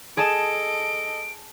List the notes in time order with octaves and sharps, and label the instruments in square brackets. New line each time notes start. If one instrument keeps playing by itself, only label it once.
[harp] G#4 A5 E7 [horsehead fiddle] A4 D#5 [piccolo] D7